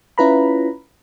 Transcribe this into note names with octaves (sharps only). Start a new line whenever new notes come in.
C#4 E4 F4 B4 A#5 B5